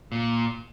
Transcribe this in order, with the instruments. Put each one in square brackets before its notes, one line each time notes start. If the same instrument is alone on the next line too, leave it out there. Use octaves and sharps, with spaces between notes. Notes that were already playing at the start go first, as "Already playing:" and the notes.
[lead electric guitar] A#2